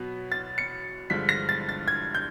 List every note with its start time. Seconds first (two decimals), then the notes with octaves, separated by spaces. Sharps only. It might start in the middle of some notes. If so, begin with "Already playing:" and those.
Already playing: B2 F#3 B3
0.32 A6
0.58 C#7
1.10 G2 D3 F3 G#3 B6
1.29 A#6
1.49 A6
1.69 A6
1.88 G#6
2.15 G6